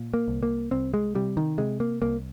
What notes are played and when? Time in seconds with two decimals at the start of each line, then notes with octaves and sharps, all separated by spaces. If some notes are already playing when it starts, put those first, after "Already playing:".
Already playing: A#2
0.14 A#3
0.28 C2
0.43 A#3
0.71 C2 C4
0.94 G#3
1.15 C3 G3
1.37 D#3
1.58 C3 G#3
1.80 A#3
2.02 C2 A#3